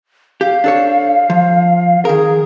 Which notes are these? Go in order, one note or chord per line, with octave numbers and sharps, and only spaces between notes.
G4 F5
D4 A4 C#5
F3
D#3 G#4 A#4